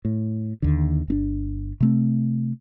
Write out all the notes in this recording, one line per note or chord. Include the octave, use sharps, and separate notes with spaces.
A2
D#2 D3
G1 C4 D4
C3 A3 C4